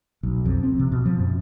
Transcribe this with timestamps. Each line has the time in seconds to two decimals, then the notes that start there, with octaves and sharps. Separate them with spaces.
0.23 B1
0.45 F2
0.63 C4
0.79 C3
0.92 B2
1.06 F3
1.19 F#2